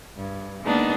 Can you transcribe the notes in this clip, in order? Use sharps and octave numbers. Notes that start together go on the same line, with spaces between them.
G2
D#3 G#3 A#3 B3 D4 D#4